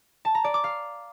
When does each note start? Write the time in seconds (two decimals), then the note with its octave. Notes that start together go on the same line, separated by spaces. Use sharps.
0.25 A5
0.35 A#5
0.44 D5
0.54 D6
0.64 F5